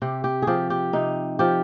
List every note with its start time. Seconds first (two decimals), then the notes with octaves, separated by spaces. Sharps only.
0.02 C3 G4
0.24 G4
0.42 F3 G4 G#4
0.70 G4
0.93 C3 D#4
1.39 F3 G4